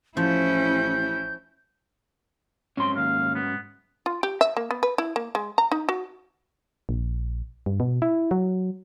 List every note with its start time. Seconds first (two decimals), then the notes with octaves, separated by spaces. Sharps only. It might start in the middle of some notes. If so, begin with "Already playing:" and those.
0.17 A1 F3 C#4 E4 G6
2.77 G#2 F#3 C4 C#4 C6
2.97 D#2 F5
3.35 B3
4.06 F4
4.23 G4
4.41 E5
4.57 A#3
4.71 B3
4.83 B4
4.98 E4
5.16 A#3
5.35 G#3
5.58 A#5
5.72 D#4
5.89 F#4
6.89 A#1
7.66 G2
7.80 B2
8.02 E4
8.31 F#3